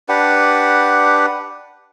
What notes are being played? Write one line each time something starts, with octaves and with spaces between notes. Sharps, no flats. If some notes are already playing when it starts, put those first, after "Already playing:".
D4 G4 B4 F#5